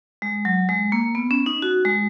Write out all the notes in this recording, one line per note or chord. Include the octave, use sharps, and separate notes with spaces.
G#3
F#3
G#3
A#3
B3
C#4
D#4
F#4
G#3